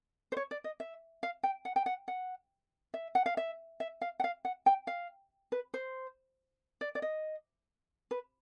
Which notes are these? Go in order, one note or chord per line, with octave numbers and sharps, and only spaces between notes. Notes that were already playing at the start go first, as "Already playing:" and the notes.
C5
C#5
D5
D#5
E5
F5
G5
F#5
G5
F#5
F#5
E5
F#5
F5
E5
E5
F5
F#5
F5
F#5
G5
F5
B4
C5
D5
D5
D#5
B4